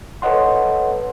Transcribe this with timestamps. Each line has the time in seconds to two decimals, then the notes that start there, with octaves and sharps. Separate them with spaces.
0.22 A4 B4 C#5 D#5 F#5 C6